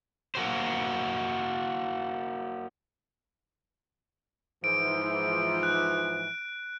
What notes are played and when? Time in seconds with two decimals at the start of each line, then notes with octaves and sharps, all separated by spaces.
0.35 A#3 F#4 C5
4.64 G#2 E3 F3 D7
5.63 F#6